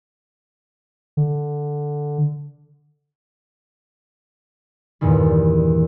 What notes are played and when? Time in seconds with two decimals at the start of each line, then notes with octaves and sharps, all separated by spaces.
1.17 D3
5.01 E2 G2 A#2 D#3 G3